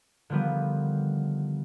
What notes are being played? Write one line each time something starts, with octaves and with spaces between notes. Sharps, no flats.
D3 D#3 F3 G3 B3